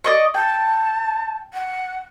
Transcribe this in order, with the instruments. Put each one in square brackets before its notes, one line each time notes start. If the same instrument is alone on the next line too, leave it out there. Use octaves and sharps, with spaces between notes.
[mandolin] D5 D#5 C#6
[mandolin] G5 [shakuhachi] A5
[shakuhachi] F#5